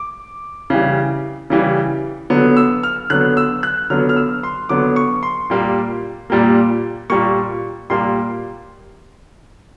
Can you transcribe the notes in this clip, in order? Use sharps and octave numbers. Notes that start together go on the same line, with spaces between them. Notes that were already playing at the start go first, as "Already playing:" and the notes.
Already playing: D6
C#3 E3 G3
C#3 E3 G3
D3 F#3 B3
E6
F6
D3 F#3 B3 F#6
E6
F#6
D3 F#3 B3 F6
F6
E6
C6
D3 F#3 B3 D6
C#6
C6
A#2 G3 A#3
A#2 G3 A#3
A#2 G3 A#3 C#6
A#2 G3 A#3 C6